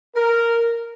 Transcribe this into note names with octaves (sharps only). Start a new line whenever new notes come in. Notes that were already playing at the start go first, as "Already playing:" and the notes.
A#4